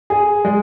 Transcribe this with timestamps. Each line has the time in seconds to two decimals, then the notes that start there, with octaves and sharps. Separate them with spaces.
0.10 G#4
0.45 G#3